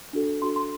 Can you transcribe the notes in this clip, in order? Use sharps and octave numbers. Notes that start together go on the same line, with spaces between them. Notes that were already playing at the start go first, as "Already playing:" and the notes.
D4 F#4 A4
D4 F#4 A4 C6
C6